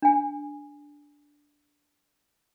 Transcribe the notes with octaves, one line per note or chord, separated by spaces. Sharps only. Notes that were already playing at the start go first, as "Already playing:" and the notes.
D4 G#5